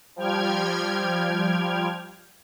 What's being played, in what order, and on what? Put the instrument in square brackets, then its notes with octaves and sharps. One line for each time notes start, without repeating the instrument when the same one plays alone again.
[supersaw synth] F3 G3 G5 F6 G#6